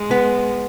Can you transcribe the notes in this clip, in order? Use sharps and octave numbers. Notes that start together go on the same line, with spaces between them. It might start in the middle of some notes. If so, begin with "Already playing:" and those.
Already playing: G#3
B3